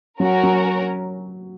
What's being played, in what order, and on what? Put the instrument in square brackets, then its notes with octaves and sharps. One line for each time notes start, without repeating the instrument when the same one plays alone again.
[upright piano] F#3 [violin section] C#4 F#4 A#4
[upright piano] F#3